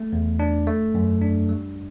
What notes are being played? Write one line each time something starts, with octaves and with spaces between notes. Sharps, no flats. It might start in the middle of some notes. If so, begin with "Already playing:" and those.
Already playing: A3
E2
D4
A3
F#2
D4
G3